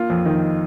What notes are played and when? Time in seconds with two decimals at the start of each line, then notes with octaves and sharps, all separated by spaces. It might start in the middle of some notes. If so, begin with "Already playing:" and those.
Already playing: A#3 F4
0.10 F2
0.25 D#3 D#4